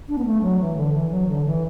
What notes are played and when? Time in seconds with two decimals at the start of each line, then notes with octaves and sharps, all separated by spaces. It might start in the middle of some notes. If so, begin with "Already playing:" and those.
0.09 D4
0.18 B3
0.25 A3
0.42 F#3
0.60 E3
0.77 D3
0.94 E3
1.11 F#3
1.28 D3
1.45 E3